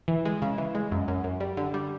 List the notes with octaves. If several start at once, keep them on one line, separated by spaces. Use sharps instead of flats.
E3
G#3
C#3
E3
G#3
F#2
F#2
F#2
G3
D3
G3